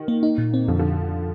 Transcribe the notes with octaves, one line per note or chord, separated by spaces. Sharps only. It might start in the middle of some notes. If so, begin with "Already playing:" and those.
Already playing: D#3
A#3
D#4
A#2
C4
F2 D3 F3
D3 F3